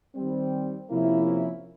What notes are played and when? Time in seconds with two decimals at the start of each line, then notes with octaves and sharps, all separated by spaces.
0.16 D#3 G3 C4
0.90 C3 F3 A#3 C#4 E4